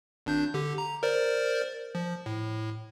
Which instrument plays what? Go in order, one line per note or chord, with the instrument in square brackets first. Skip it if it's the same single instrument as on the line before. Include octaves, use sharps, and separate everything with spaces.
[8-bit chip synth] G#1 D4 G6
D3 G4
A#5
A#4 C5 D5
F3
A2